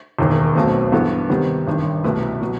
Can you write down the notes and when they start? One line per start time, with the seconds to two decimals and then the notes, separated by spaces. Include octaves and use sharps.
0.19 E1 D#2 D#3
0.55 B1 B2 A3 C4
0.92 G2 E3 B3 E4 A4
1.29 C3 D#3 G3 B3
1.67 A1 G2 D#3
2.04 C2 B2 A3 E4 B4
2.41 B2 F#3